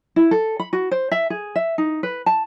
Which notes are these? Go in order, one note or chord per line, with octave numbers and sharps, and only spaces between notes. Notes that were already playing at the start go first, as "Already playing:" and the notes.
E4
A4
B5
F#4
C5
E5
G#4
E5
D#4
B4
A5